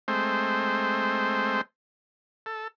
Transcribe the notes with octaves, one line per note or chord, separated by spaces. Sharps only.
G#3 A3 C4 C5
A4